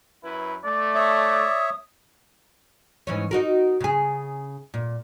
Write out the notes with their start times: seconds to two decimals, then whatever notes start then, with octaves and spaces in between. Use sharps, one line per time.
0.23 F#2 E4 B4
0.64 A3 D5
0.95 C#5 E5 D#6
3.07 G#2 E3 C#4
3.31 D#4 F#4 A#4
3.80 C#3 G#4
4.74 A#2